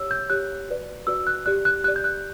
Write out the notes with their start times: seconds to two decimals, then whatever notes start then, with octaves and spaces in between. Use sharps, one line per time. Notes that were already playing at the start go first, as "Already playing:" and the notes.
Already playing: G4 C#5 E6
0.11 G6
0.30 G4 C#5 F#6
0.69 F#4 B4 D5
1.07 F#4 B4 D5 E6
1.27 F#6
1.46 G4 D5 F#6
1.65 F#6
1.84 G4 D5 F#6
1.96 G6
2.04 F#6